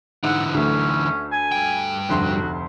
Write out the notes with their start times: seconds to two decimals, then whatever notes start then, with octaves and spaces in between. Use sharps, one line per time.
0.24 G#2 D3 E3 F#5
0.54 D2 A3 C#4
1.32 G#5
1.52 G2 G5
2.09 F1 D2 F#4 C6